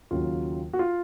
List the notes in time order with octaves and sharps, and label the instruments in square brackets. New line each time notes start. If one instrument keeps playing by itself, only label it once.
[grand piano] D#2 C#3 F#3 F4
F#4
F4